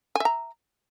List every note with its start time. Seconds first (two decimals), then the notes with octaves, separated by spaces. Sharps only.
0.15 G#5
0.20 E5
0.25 A#5